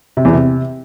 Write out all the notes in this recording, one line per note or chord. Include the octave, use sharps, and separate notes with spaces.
C3
E2
C3